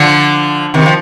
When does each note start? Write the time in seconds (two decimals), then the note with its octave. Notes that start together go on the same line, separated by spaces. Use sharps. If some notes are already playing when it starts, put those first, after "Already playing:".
Already playing: D3 F3
0.74 C3 D#3
0.86 F3